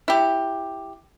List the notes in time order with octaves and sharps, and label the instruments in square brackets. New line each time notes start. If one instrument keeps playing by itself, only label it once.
[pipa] E4 G4